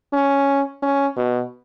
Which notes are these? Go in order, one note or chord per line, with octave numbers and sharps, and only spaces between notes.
C#4
C#4
B2